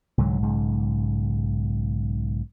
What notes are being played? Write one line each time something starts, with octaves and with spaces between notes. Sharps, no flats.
C2 G#2 D3 F#3
B1 G#2 C#3